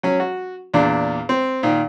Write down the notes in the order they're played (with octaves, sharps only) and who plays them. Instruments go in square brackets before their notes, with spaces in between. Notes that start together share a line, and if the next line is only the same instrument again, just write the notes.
[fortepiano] F#3 C#4
F#4
E2 A#2 D4
C4
A#2 D#3